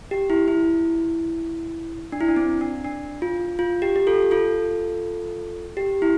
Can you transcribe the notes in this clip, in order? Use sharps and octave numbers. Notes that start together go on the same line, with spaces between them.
G4
E4
E4
D4
E4
D4
C4
D4
D4
F4
F4
G4
G4
F4 A4
F4 A4
G4
E4